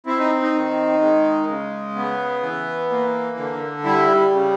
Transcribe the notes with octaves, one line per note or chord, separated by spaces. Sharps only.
C4 E4
D#4
D#4
D#3
G#3
C#3
B3
E3
A#3
D3
G3 E4
C#3